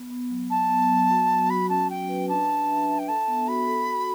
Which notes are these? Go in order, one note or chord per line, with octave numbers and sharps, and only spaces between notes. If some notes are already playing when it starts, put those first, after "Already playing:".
Already playing: B3
B3
F#3
F#3 A5
B3
F#3
F#4
F#3
F#4 B5
C#4 A5
C#4 G5
B4
D4 A5
D4
E5
E5
G5
A4 A5
B3
F#4 B5
A4
F#4